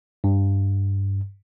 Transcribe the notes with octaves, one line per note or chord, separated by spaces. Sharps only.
G2